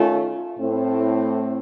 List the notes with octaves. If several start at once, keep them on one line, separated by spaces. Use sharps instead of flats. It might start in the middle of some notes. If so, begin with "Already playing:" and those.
Already playing: D#3 A3 C#4 F4
A2 A3 C4